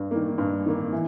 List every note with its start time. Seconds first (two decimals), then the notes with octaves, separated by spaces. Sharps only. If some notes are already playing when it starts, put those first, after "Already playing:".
Already playing: G2
0.11 D#3 A#3
0.38 G2
0.66 D#3 A#3
0.93 E3